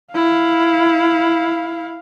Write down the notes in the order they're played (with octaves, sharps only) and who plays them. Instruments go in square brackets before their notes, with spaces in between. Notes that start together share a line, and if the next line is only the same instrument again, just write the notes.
[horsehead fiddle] E4 F5